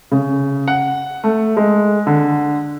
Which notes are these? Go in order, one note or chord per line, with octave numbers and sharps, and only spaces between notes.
C#3
F#5
A3
G#3
D3